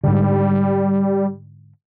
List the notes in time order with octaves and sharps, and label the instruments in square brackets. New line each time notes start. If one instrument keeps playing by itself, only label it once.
[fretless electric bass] G#2 D3 [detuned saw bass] G3